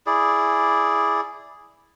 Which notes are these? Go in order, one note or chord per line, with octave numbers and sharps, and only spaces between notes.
E4 G#4 D5